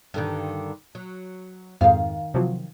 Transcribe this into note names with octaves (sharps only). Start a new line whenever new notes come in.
G2 D3 D#3
F#3
F2 G#2 D#3 F5
C3 F3 F#3